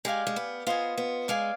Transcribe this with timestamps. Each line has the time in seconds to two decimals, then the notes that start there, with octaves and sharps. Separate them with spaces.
0.05 G#3 G4 D5 F5 G#5
0.27 G#3
0.36 B3
0.67 B3 F4 C5 D#5 G#5
0.98 B3
1.28 G#3 D5 F5 G#5